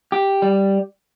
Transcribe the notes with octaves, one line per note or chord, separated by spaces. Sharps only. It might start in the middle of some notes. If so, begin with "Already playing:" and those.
G4
G3